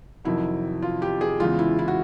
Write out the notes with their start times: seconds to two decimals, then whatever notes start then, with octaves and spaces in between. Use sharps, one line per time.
0.25 F2 C3 D#3 F#3 E4
0.82 F4
1.02 G4
1.21 G#4
1.40 E2 C#3 E3 G#3 F4
1.59 E4
1.79 E4
1.88 F#4